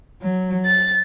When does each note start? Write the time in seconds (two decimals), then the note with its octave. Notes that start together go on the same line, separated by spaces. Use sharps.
0.21 F#3
0.65 A6